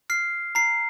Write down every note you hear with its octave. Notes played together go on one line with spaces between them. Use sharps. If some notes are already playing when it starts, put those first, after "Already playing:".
F6 C7
A#5 C7